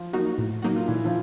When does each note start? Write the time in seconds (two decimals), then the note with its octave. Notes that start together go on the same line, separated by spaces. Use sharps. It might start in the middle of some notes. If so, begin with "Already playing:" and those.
Already playing: F3 F4
0.13 F#3 A#3 D#4 F#4
0.38 A2
0.62 F#3 A#3 D#4 F#4
0.76 F4
0.88 A#2 E3 E4
1.04 F3 F4